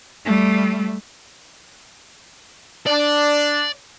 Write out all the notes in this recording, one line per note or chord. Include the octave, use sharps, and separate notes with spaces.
G3 A3
D4 D5